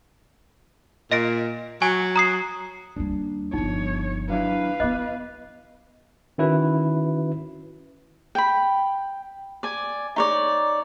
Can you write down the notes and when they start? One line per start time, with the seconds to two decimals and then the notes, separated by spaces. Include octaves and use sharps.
1.11 A#2 D#5 A#6 D7
1.82 F#3 G#5
2.16 A#5 D#6 C7
2.96 D#2 G3 D4
3.53 G1 F3 D#4 C#5
4.30 F#3 D4 E4 B4 F5
4.80 B3 E4 D#5 D6 F#6
6.38 D#3 C#4 E4 F#4 B4
8.35 G5 B5
9.63 D5 G#5
10.16 D#4 C#5 D5